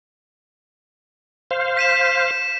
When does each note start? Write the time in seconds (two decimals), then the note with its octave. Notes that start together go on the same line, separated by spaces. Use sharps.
1.51 C5 F5
1.77 B6 D#7 E7